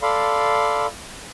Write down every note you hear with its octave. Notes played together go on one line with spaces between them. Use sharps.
A4 D5 F5 B5 C6